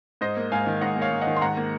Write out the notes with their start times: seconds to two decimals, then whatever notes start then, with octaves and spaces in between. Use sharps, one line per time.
0.21 G#2 C5 D#5
0.37 A#3
0.52 G#2 F5 G#5
0.67 D#3
0.81 G#2 D#5 F#5
0.96 A#3
1.01 C#5 F5
1.11 G#2
1.21 D#5 F#5
1.27 D#3
1.36 C6
1.41 G#2 F#5 A#5
1.57 A#3